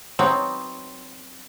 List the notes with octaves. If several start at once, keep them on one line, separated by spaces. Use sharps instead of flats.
F#3 B3 C4 D#4